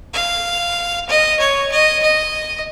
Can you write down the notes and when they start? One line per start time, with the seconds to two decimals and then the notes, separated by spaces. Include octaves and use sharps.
0.14 F5
1.09 D#5
1.39 C#5
1.72 D#5
2.03 D#5